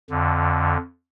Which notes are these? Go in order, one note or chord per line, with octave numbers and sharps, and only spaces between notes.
F2 D3